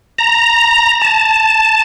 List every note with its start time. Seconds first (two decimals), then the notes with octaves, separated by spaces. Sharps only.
0.19 A#5
1.02 A5